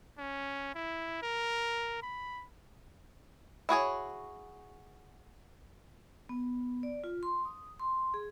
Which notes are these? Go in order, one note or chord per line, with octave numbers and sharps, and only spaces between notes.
C#4
E4
A#4
B5
E4 F#4 G#4 C#5
B3
D5
F4
C6
D#6
C6
G#4